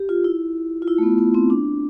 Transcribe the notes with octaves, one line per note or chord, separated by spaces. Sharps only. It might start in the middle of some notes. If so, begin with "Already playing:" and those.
Already playing: G4
F4
E4
F4
E4
A3
B3
B3
C4
D4